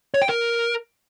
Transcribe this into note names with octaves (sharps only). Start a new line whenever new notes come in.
C#5
G5
A#4